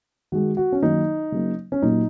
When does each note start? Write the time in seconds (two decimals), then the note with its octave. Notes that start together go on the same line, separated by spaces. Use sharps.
0.32 D#3 G#3 F#4
0.57 F#4
0.72 C#4
0.82 D#3 F#3 A#3 D#4
1.32 C#3 F#3 A#3
1.72 C#4
1.82 A#2 F#3 A#3 D#4